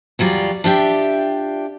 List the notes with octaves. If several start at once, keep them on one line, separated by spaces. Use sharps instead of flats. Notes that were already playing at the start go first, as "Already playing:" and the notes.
E2 F#3 G3 F4 D5
D4 F4 G4 D5 E5 G5